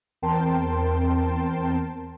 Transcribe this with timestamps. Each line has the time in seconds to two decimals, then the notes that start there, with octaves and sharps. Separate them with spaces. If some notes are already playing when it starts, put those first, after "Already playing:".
0.22 E2 C4 A#4 G5 A5 C6